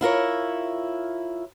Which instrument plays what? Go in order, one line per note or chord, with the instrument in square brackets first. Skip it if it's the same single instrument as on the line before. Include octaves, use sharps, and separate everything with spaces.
[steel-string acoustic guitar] E4 F4 A#4 C#5